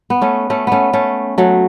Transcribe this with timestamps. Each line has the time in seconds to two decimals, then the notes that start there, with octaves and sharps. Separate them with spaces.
0.10 B3
0.22 A3 C#4
0.50 A3 C#4
0.67 A3 B3 C#4
0.93 A3 C#4
1.38 F#3 A3